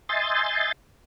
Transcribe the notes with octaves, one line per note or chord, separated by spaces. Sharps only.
D#5 E5 G#5 C6 G6 A6